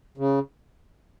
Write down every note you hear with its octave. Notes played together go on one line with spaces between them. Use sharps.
C#3